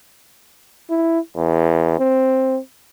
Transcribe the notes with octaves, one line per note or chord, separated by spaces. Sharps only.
E4
E2
C4